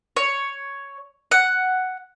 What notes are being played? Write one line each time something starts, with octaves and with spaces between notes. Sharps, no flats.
C#5
F#5